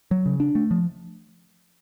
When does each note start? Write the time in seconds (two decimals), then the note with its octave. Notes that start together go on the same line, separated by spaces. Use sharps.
0.11 F#3
0.26 C#3
0.40 D4
0.55 A3
0.71 F3